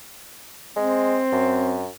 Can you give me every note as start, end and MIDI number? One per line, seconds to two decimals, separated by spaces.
0.76 1.20 56
0.76 1.82 60
1.33 1.89 42